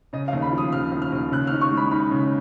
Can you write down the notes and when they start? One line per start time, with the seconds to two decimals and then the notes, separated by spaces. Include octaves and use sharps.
0.13 C#3 D#5
0.28 F5
0.33 D#2
0.42 B5
0.52 F3
0.58 D#6
0.73 D#2 F6
0.92 D#2
1.02 F6
1.12 D#2
1.32 C#3 F#6
1.47 F6
1.52 D#4
1.61 C#6
1.71 G#3
1.77 B5
1.91 D#4 B5
2.11 C#3